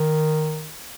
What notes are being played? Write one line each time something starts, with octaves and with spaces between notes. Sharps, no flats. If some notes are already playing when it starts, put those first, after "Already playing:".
Already playing: D#3